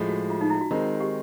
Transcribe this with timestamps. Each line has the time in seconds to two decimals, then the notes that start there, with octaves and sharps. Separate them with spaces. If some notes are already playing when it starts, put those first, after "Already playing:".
Already playing: A2 F3 G#3
0.09 F#4
0.30 F4
0.41 D#4
0.50 E4
0.61 F#4
0.71 D#3 G#3 C4 F4
1.00 G4